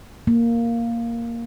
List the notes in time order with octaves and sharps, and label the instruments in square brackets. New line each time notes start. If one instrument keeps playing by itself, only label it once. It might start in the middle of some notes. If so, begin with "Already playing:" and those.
[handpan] A#3